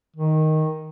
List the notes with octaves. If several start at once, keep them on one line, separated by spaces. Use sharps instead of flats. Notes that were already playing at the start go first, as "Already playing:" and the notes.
D#3